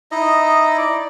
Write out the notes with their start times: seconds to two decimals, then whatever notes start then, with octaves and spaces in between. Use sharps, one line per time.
0.11 D#4 E4 D#5
0.78 D5